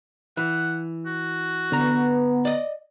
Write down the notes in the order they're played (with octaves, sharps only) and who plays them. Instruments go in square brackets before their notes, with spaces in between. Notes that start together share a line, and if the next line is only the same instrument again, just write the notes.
[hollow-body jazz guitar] E3 [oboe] F#5
[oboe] F#4
[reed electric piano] D3 A#5 [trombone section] B3
[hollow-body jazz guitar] D5 D#5